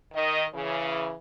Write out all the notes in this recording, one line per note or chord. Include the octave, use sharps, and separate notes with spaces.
D#3 D#5
C#3 E3